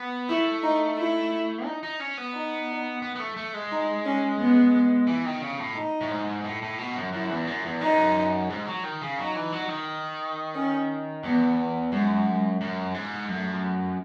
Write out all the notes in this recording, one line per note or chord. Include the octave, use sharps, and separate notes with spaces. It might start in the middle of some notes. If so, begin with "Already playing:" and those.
Already playing: B3
A3 E4
D#4
E4
D#4
D#4
C#4
B3
D#4
B3
B3
A3
A3
G#3
D#4
C#4
B3
E3
D#3
C#3
A2
D#4
A2
G#2
A2
A2
B2
F#2
F#2 E4
E2
F#2
E2
F#2 D#4
G#2
F#3
D#3
C#3
F#3 D#4
E3
F#3
D#3
C#4
E2 B3
F#2 G#3
F#2
G#2
F#2 A3